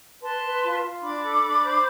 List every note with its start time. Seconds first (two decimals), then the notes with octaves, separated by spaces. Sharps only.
0.23 B4 A5 C6
0.43 B4
0.63 F4
0.83 F4
1.02 D4 B5 D6
1.22 A4
1.42 D4
1.62 C5